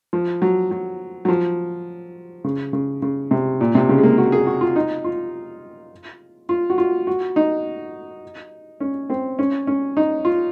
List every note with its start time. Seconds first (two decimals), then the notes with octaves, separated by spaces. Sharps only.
0.13 F3
0.42 F#3
0.71 F#3
1.25 F#3
1.29 F3
2.44 C#3
2.73 C#3
3.02 C#3
3.31 C3
3.61 A#2
3.75 C3
3.89 C#3
3.98 G#3
4.03 A#3
4.18 F#4
4.32 G#4
4.47 F#4
4.61 F4
4.76 D#4
5.04 F4
6.49 F4
6.70 F#4
6.78 F4
7.07 F#4
7.36 D#4
8.80 C#4
9.10 C4
9.39 C#4
9.67 C#4
9.97 D#4
10.25 F4